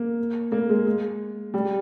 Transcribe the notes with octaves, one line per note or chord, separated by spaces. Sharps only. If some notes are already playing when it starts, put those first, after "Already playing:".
Already playing: A#3
A#3
G#3
G#3
G3